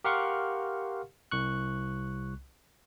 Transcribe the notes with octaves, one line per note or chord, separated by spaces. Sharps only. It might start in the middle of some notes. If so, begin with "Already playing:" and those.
G4 A#4 F5 F#5 C6 C#6
C2 C#6 F#6